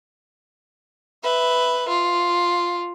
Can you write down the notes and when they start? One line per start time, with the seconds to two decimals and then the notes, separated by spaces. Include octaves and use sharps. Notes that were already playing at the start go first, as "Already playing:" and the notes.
1.23 B4 E5
1.89 F4